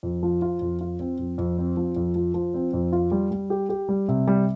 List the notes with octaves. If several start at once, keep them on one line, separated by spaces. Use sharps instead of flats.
F2
F3
F4
F2
F4
C4
F2
F2
C4
F3
F2
F3
F3
C4
F2
F4
G3
G3
G4
G4
G3
C3
G3